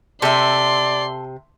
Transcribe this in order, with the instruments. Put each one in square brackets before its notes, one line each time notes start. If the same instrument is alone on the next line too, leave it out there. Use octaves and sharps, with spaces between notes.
[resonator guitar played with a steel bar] C3 [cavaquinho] A4 E5 [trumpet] D5 [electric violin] C6